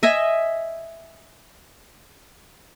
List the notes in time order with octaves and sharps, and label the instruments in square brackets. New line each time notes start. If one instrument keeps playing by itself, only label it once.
[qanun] D#5 E5 G#5